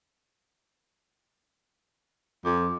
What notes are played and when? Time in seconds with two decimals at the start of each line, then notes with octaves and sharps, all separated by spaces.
2.45 F2 D6